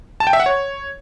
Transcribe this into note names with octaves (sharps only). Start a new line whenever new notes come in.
A5
G5
E5
F#5
C#5